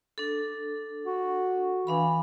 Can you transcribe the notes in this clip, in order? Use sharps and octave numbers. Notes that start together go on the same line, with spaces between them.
D4 A4
F#4
E3 D4 F5 B5